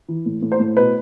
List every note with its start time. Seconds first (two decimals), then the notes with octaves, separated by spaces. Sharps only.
0.08 E3
0.26 A2
0.42 A2
0.52 C5
0.60 A2
0.77 B2 B4